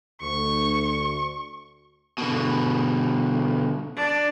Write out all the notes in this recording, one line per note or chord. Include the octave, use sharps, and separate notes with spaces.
D2 C#6
B2 D3
D4